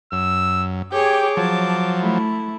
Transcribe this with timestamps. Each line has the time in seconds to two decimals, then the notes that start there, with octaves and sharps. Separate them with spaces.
0.12 F#2 E6
0.92 G4 G#4 C#5 G5 D6
1.37 F3 F#3 A5
2.01 A3 E4